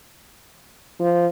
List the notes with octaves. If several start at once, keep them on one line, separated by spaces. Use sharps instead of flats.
F3